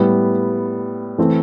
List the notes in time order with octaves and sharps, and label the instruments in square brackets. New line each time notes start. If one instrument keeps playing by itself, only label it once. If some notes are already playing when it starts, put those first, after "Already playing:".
Already playing: [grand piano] A2 G3 B3
E3 A3 C4 E4